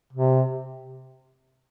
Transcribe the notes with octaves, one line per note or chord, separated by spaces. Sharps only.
C3